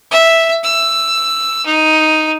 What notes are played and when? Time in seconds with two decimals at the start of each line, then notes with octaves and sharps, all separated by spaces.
0.11 E5
0.63 E6
1.66 D#4